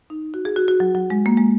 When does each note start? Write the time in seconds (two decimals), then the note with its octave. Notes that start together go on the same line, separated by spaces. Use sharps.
0.10 D#4
0.34 F#4
0.45 G#4
0.56 F#4
0.68 F#4
0.80 F#3
0.95 F#3
1.10 G#3
1.26 A#3
1.37 G#3